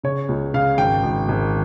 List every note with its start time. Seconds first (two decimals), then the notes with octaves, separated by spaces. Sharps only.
0.03 C#3 C#5
0.29 C#2
0.54 C#3 F5
0.78 G#1 G5
1.04 G#1
1.29 G#1